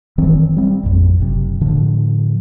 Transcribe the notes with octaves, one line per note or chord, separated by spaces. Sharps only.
F#1 D#3 E3 C4
G3 C4
A1 F2
F#1 C3
A2 D3 F3